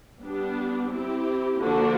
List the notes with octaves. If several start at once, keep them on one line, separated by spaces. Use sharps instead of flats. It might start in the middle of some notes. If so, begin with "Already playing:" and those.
G3 B3 D4 G4
C4 E4 G4
D3 F3 A#3 D4 F#4